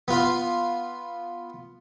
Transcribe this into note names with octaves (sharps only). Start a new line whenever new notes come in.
B3 F4